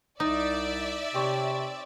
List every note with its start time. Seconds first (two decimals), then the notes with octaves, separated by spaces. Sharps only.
0.20 C2 D#4 D5 E5
1.14 C3 C4 G4 C#5